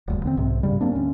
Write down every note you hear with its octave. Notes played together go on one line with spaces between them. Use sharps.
D#1 D2 G2
D3 B3 C4
B1 G#2 C3
G2 C#3 G3
F#3 A#3 C4 D4
D2 C#4